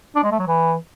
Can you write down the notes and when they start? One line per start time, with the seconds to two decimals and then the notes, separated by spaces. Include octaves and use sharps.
0.16 D4
0.24 G#3
0.31 A3
0.39 F#3
0.47 E3